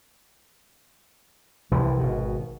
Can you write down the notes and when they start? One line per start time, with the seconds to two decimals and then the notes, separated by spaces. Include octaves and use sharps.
1.71 C2 C3 E3 F3
1.99 G#1 B2